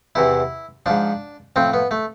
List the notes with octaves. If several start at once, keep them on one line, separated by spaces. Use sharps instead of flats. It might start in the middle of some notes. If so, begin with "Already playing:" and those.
E2 C3 E3 E4
G#2 F3 D4
A2 F3 C4
B3
A3